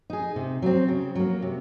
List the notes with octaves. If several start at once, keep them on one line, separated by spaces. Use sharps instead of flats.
D#4 G#4
C3
F#3 C4
C#3
F#3 A#3
C3